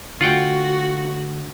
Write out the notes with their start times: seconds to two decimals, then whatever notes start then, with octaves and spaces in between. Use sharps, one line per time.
0.21 D3 A3 F4 F#4 F#5 G5